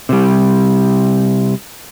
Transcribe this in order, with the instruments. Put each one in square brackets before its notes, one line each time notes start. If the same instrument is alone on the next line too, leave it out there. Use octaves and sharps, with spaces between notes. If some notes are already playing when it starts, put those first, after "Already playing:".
[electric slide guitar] C3 G3